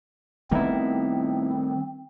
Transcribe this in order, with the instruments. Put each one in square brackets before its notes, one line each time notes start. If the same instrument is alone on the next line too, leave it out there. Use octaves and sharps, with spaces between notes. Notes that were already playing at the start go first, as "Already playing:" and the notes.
[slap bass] D#3 G3 A3 [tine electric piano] B3 D#4 E4 [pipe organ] C4